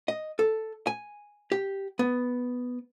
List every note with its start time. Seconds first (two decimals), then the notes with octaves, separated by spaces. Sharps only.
0.08 D#5
0.39 A4
0.87 G#5
1.52 G4
1.99 B3